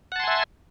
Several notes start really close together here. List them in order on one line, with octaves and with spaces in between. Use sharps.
F#5 A5 C6 G#5 E5